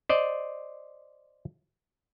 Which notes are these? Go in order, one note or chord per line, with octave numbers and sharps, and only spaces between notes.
C5 D5 D#5